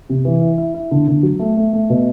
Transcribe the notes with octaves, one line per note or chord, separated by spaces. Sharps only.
C3
E3
E4
E4
E4
D3
D3
F#3
A3
A3
A3
B2